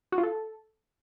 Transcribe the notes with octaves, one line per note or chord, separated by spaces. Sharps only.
F#4
F4
A4